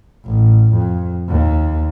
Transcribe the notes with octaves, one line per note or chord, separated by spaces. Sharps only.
A1
F2
D#2